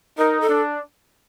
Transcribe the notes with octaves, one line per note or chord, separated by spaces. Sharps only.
D#4 A#4
A4
D4